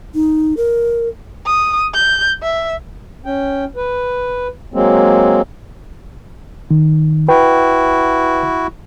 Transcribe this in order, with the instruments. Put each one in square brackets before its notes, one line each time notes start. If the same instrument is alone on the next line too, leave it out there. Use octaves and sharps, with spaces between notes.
[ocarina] D#4
A#4
[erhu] D#6
G6
E5
[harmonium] C#4 G5
B4
F#3 G#3 A#3 C4
[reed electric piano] D#3
[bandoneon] E4 F#4 [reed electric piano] B4 G5